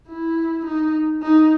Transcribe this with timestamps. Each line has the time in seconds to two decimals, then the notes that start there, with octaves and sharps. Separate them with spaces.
0.09 E4
0.66 D#4
1.22 D#4